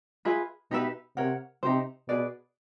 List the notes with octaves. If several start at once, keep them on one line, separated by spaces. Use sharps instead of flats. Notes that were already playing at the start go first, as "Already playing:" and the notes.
F4 G#4 B4 E5
B2 D#4 G4 B4 E5
C3 A#4 C#5 F#5
C3 D#4 G4 C5
B2 G#4 B4 D5